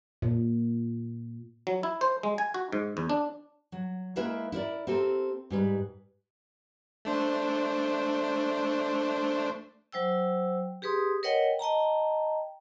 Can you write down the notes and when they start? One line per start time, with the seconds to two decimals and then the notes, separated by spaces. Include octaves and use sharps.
0.22 A#2
1.67 F#3
1.83 E4
2.01 C5
2.23 G#3
2.38 G#5
2.54 F#4
2.72 G#2
2.97 E2
3.09 D4
3.72 F#3
4.16 G#3 A#3 E4 A#4 B4 E5
4.52 E4 A#4 D5
4.87 C4 G4 A4 A#4
5.50 G#2 G3 B4
7.05 A3 D4 C5
9.93 F#3 C5 G5 E6
10.82 G4 G#4 B4 C6 D#6
11.23 A#4 B4 C#5 D#5 F#5 G5
11.59 D#5 G5 A5 A#5